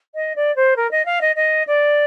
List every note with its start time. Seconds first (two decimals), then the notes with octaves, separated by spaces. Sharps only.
0.15 D#5
0.36 D5
0.56 C5
0.76 A#4
0.91 D#5
1.05 F5
1.21 D#5
1.36 D#5
1.67 D5